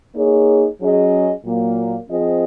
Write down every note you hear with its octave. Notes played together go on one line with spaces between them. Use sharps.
A#3 D#4 G#4 C#5
F#3 C#4 G#4 D#5
A#2 F#3 A#3
F3 C4 F4 G#4 D#5